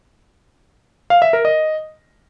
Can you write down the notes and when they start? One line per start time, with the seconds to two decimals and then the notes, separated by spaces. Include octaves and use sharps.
1.10 F5
1.22 E5
1.33 A#4
1.45 D#5